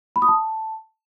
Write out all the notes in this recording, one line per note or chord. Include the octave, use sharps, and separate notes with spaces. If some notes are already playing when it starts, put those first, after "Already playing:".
B5
D#6
A5